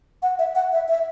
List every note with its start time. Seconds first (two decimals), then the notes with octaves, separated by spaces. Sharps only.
0.23 F#5
0.39 E5
0.55 F#5
0.73 E5
0.88 E5